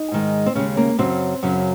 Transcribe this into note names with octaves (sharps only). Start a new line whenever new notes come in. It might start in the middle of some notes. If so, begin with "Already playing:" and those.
Already playing: D#4
G#2 D#3 G#3
C4
D#2 C#3 G#3 C#4
A#3
F#2 C#3 F#3 C4
F#2 C#3 F#3